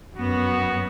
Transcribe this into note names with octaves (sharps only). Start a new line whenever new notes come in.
F#2 B3 F#4